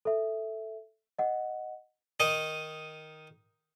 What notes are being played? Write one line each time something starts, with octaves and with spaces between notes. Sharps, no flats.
A4 E5
D#5 F#5
D#3 D#4 D#5